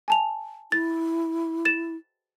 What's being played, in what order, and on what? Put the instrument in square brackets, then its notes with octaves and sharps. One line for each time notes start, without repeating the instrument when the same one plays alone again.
[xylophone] G#5 A5 F7
[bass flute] E4 [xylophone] A6
[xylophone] A6 E7